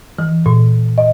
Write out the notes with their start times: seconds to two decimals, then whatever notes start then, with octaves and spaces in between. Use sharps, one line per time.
0.19 E3
0.46 A#2
0.98 D#5